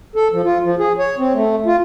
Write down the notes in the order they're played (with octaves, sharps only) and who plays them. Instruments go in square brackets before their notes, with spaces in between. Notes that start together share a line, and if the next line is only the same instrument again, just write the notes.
[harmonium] A4
F3
F4
F3
G#4
C#5
C4
A3
F4